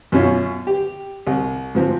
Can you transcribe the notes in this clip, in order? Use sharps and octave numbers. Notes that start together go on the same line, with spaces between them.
F#2 B2 C#4 F4
G4
C2
G#2 F3 C4